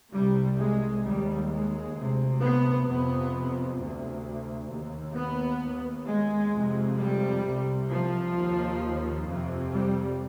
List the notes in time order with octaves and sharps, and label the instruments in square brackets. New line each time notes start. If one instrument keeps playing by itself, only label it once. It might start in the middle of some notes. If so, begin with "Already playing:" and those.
[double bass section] C2 C3 G3
G#3
D#2 G3
G#3
D2 C3
B3
F2 C3 B3
D2 C3
D#2
B3
D#2
G#3
F2 C3
G3
C2 C3
F3
D#2
F2 C3
G3